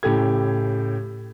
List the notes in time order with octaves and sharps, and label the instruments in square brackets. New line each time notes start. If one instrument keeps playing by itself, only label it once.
[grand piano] A2 C#3 G4 A4 G#6